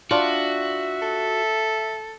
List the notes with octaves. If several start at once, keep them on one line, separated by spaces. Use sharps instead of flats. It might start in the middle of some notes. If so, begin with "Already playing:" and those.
D4 F4 F#4 E5
A4